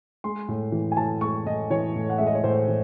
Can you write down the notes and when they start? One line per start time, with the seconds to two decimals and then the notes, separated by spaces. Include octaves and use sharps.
0.24 G#3 C6
0.48 A2
0.72 E3
0.92 G#5
0.97 A2 A5
1.21 G#3 C#6
1.46 A2 D#5
1.70 E3 C#5
1.95 A2
2.10 F#5
2.18 G#3 E5
2.27 D#5
2.35 C#5
2.44 A2 C5
2.68 E3